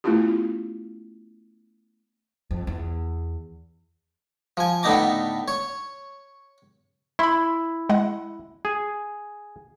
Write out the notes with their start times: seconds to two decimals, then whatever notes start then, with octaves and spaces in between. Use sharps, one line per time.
0.04 A3 B3 C#4 E4 F4 G4
2.51 F2
2.67 E2
4.57 F3 G#5
4.83 A2 D3 B3 D#4 A#5 D6
5.48 C#5
7.19 E4 B5 C6
7.89 G#3 F#5
8.65 G#4